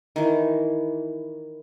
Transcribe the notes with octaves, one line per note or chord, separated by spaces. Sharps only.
D#3 E3